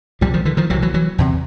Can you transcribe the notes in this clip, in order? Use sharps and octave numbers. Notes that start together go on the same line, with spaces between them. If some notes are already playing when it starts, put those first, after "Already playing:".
C2 C3 F3 G3
D#3 F3
D3 E3
D#3 F3
C2 C3 E3 F#3
E3 F#3
E3 F#3
E2 C3